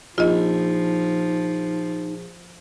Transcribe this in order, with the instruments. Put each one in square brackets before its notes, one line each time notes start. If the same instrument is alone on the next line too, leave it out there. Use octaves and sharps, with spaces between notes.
[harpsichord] A#1 [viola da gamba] F3 [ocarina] D#4 [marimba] F4 D#5